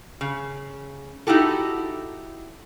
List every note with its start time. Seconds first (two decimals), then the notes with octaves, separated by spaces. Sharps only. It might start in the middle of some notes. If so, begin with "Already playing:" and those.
0.21 C#3
1.27 D#4 E4 F#4 G4 A4